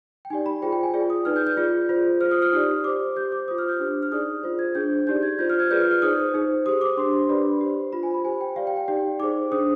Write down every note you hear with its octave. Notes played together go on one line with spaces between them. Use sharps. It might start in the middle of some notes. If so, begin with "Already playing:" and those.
G5
D#4 G4 D5 G#5
B5
F4 G#4 C5 G5
G5
G#5
F4 G#4 D5
D#6
D#4 B4 D5 F6
G6
G6
F4 G#4 D5
F4 C5
F4 C5 F6
D#6
F6
D#4 G4 D5 D#6
G4 C5 D6
G4 C5 G6
D6
F4 C5 D#6
F6
G6
D4 G4 C5
F6
D#4 G#4 D5 D#6
F4 C5
G#6
D4 G#4 C5 G6
D#4 G4 D5 G6
G#6
F4 C5 G6
F6
G#6
F4 G#4 B4 D5 G6
F6
F6
D#4 G#4 C5 D#6
D#4 G#4 C5
G4 C5 D#6
D6
D4 G4 C5 C6
C6
D4 G4 B4 D5 B5
G4 C5
F4 C5 B5
G#5
B5
G4 C5 G#5
G5
G4 D5 F5
G5
G5
D#4 G4 D5 G5
D#4 G#4 C5 D6
D4 G#4 C5 D#6